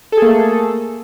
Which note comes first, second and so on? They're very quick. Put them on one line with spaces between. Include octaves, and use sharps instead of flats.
A4 G#4 A#3 A3